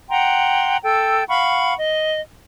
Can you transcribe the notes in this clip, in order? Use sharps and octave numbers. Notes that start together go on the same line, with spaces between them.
F#5 G5 A#5 C6
A4 G5 E6
F5 F#5 B5 C#6
D#5